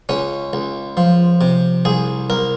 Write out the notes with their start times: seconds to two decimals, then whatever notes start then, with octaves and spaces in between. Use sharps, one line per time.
0.09 C#2 C#4
0.53 C#2
0.97 F3
1.41 C3
1.85 C2 G#4
2.30 C2 A#4